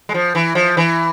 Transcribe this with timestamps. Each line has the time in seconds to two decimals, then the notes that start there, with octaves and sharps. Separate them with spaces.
0.09 G#3
0.14 F3
0.35 E3
0.55 F3
0.77 E3